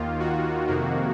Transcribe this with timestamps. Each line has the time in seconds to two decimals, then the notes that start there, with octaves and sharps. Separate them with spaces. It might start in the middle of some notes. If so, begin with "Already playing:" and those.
Already playing: D#2 D#3 A#3 F4
0.20 F#4
0.67 F2 C3 D#3 A#3